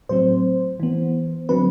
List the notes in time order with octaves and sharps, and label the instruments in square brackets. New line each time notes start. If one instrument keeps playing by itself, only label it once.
[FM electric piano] A2 F#3 C4 C5
E3 B3
D3 F#3 C4 B4